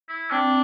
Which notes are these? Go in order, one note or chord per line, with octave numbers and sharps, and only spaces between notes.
E4
C4 D4